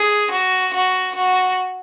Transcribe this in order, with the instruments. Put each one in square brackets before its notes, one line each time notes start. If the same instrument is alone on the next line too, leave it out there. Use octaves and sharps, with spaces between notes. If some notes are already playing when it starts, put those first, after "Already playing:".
Already playing: [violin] G#4
F#4
F#4
F#4